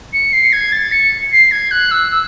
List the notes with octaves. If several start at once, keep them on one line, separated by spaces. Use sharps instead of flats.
C#7
C7
G#6
A6
C#7
C7
G#6
F#6
E6
E6